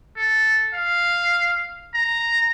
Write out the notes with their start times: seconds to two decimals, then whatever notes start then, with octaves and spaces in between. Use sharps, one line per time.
0.17 A4
0.75 F5
1.95 A#5